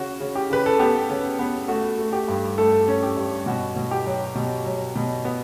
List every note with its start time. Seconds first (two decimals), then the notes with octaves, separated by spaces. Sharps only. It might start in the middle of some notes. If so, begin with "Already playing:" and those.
Already playing: C#3 F#4
0.20 C#3
0.35 G4
0.50 C#3 B4
0.66 A4
0.79 B3 G4
1.10 C#3
1.39 B3
1.68 A3 F#4
1.98 A3
2.13 G4
2.28 G2
2.58 A3 A4
2.88 C#4
3.03 G4
3.16 G2
3.46 B2 F#4
3.76 B2
3.91 G4
4.06 F#3
4.35 B2
4.65 F#3
4.96 B2
5.25 B3